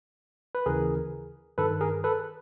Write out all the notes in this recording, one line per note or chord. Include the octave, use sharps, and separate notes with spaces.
B4
D#2 C#3 E3 G#4 A#4
G2 D#3 A4 B4
G#4 A#4
A4 B4